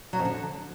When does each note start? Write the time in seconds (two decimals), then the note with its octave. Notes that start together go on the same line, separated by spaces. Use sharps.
0.13 F#3
0.19 F2
0.25 D3